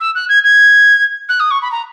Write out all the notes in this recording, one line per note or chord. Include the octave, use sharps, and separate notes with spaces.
E6
F#6
G#6
G#6
F#6
D#6
C#6
B5
A#5